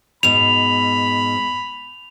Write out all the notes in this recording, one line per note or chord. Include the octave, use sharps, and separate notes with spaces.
G#2 B2 B5 F7